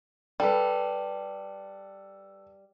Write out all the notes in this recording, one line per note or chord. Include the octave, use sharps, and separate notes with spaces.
G3 A4 B4